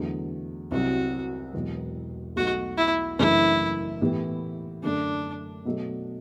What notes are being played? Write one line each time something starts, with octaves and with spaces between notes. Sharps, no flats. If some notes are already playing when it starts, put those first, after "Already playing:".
Already playing: E2 D3 F#3 A3
C2 C3 F#3 C4 F#4
E1 E2 B2 F#3 B3
B1 B2 A3 F#4
E4
F#1 F#2 E3 A3 D4 E4
A2 E3 B3 E4 G4
F#2 D3 A3 D4
B2 F#3 A3